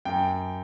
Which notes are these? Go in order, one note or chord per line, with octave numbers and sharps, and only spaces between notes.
F#2 G5